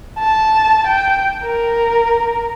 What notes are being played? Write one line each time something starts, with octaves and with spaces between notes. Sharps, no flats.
A5
G5
A#4